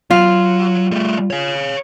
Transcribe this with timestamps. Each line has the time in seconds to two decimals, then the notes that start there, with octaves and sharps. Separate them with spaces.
0.11 F#3 F4
0.92 G3 A3
1.30 C#5 F5